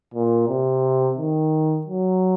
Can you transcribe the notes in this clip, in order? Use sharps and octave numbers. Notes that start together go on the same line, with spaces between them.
A#2
C3
D#3
F#3